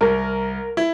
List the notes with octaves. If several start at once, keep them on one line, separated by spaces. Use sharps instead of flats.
C2 A#4
E4